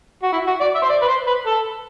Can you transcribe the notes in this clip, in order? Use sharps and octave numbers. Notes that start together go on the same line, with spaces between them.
F#4
E4
F#4
D5
E5
C5
D5
B4
C5
B4
A4